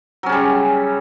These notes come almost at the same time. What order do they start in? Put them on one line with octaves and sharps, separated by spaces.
F#3 C#4 C#3 G3